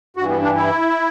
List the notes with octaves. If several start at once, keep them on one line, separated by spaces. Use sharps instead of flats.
G2 E3 F#4
B3
D4
E4